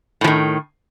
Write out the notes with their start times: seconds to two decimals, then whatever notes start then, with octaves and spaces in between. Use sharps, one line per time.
0.21 A2
0.24 F3
0.27 D#3